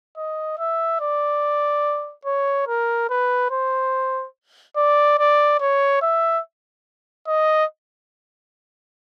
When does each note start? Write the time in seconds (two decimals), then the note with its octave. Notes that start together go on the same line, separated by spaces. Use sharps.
0.17 D#5
0.59 E5
1.01 D5
2.25 C#5
2.67 A#4
3.10 B4
3.51 C5
4.76 D5
5.18 D5
5.60 C#5
6.02 E5
7.27 D#5